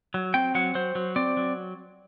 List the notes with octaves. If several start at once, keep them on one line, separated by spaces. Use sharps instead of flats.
F#3
C4 G5
F#3 F#5
F#3 C5
F#3
C4 D5
F#3